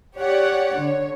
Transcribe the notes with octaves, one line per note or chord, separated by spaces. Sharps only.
G4 C#5 D5 F#5
D3 C#5